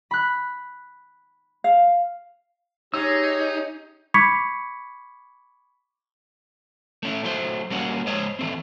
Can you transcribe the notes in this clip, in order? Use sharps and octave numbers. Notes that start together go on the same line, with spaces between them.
B5 F#6
F5
D#4 G4 G#4 C#5 E6
B5 C#6 D6 G#6 B6 C#7
A3 C#4 E4
F#3 A3 C5
G3 A#3 C#4 F#4
G#3 C5 C#5 D#5
E3 A3 C4